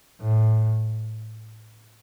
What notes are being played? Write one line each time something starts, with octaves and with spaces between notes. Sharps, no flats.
A2